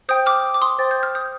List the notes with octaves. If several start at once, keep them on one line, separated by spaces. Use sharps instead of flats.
C5 G5 D#6 G6
D6 F6
D6
C6 D#6
C5 G5 A6
G6
F6
D#6 G6